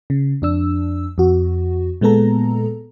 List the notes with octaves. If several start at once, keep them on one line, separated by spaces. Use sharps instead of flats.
C#3
F2 D4 E6
F2 F#4
A#2 G#3 B3 A4 A#5